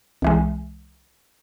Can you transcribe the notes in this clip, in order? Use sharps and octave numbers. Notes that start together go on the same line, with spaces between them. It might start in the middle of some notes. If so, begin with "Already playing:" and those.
C2 E3 G#3